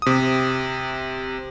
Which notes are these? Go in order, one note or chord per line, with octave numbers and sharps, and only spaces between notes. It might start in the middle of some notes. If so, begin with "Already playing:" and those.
C3 D#6